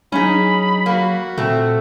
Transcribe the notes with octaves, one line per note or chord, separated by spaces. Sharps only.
F#3 C#4 D#4 G#4 B5
A#3 F#4
A#2 A3 C4